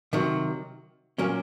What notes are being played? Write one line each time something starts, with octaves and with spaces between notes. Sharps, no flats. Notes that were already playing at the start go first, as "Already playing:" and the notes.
C3 D#3 F#3
A#2 F#3 A#3 C#4